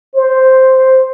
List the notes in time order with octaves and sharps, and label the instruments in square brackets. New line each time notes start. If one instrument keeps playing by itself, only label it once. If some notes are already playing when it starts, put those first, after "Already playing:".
[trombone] C5